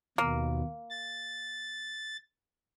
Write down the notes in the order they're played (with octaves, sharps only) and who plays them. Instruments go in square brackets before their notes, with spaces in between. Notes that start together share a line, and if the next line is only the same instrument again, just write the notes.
[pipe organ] D#2 B2 [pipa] A#3
[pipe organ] A6